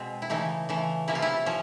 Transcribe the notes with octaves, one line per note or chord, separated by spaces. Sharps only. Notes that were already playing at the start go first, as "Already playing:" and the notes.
Already playing: B2 G#3 C4
E4
C#3 E3 A3 D#4
C#3 E3 A3
C3 F3 A#3 C#4 E4
F4
E4
F3 C#4